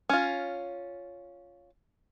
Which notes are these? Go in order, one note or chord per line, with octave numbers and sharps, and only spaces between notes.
C#4 F4